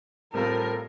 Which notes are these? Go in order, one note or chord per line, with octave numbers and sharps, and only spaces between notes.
A2 G3 C4 F4 A4 A#4